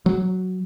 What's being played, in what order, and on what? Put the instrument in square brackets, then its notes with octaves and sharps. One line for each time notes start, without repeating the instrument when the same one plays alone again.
[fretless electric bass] F#3